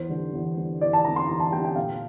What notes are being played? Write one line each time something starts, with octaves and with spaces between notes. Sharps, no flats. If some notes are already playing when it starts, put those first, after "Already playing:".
Already playing: E2 C5
D3 G3
E2
D3 G3
E2 D5
A5
D3 G3 A#5
C6
E2 A#5
A5
D3 G3 G5
G5
A#2 F5